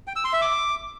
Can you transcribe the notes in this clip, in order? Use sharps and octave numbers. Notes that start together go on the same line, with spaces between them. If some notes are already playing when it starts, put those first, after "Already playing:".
G5
E6
C6
E5
D6